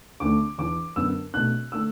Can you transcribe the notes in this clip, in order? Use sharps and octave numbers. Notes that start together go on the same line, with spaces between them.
D2 D3 A3 D4 D6
E2 E3 D4 D6
F#2 D3 B3 D4 E6
B2 A3 D4 F#6
D3 A3 D4 E6